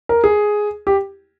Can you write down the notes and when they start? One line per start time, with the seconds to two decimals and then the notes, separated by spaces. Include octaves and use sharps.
0.09 A#4
0.24 G#4
0.87 G4